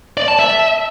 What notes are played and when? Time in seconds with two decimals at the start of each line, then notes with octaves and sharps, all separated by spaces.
0.17 D5
0.28 A5
0.39 E5